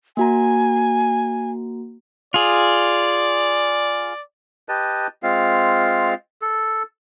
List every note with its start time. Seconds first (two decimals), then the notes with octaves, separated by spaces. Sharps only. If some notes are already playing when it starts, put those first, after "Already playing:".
0.17 A#3 F#4 G#5 A#5
2.34 F4 G#4 D5
4.69 G4 B4 D#5 A5
5.23 G#3 C4 F4 F5
6.42 A4